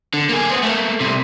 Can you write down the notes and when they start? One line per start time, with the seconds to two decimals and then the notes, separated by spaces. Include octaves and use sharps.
0.14 D3
0.29 A#3 G#4
0.50 B3 C4
0.63 A3 A#3
1.00 C2 C3